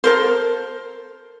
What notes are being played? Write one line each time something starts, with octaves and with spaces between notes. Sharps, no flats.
A4 A#4 C5